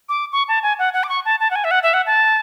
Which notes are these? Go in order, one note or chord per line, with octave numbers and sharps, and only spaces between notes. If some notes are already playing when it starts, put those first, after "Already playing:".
D6
C#6
A5
G#5
F#5
F#5
D6
C#6
A5
A5
F#5
G#5
E5
F#5
E5
F#5
A5